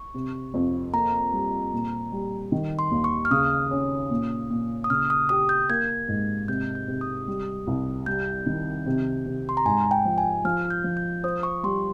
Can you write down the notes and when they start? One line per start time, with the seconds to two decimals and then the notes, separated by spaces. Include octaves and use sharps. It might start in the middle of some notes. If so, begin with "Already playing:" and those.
Already playing: C#6
0.14 C3
0.54 F2
0.93 A#3 A#5
1.33 G3
1.73 A#2
2.12 G3
2.52 D#3
2.79 C6
2.91 D#2
3.04 C#6
3.25 F6
3.31 C#3 D#6
3.71 C#4
4.10 A#2
4.50 A#2
4.84 D#6
4.90 C#3 F6
5.10 D#6
5.29 G4 D#6
5.49 G6
5.69 A#3 G#6
6.08 G#2
6.48 C3 G6
6.75 G6
6.88 C3
7.01 D#6
7.27 G3
7.67 C2
8.06 G3 G6
8.46 D#3
8.86 C3
9.26 C3
9.49 C6
9.57 A#5
9.65 G#2 G#5
9.91 G5
10.05 F3
10.18 G#5
10.44 F3 F6
10.70 G6
10.84 F3
10.97 G6
11.24 C5 D#6
11.43 C#6
11.63 G3 C6